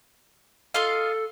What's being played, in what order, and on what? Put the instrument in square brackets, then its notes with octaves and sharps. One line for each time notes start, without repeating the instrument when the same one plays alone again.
[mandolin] F4 D#5 F5 [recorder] A4